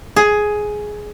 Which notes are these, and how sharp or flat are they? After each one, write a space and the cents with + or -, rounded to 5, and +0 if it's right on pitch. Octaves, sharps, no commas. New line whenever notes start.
G#4 +10